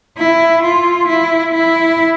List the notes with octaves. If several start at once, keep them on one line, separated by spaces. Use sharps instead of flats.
E4
F4
E4
E4